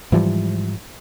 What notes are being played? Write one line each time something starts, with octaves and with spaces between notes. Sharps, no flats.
G#2 E3 F3 G3